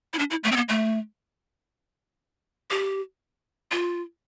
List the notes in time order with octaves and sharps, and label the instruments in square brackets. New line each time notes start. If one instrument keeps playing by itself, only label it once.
[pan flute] E4
D4
E4
A3
C4
B3
A3
G4
F4